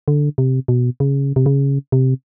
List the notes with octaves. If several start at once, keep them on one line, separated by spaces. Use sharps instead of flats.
D3
C3
B2
C#3
C3
C#3
C3